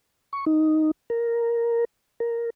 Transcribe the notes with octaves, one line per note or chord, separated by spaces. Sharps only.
C#6
D#4
A#4
A#4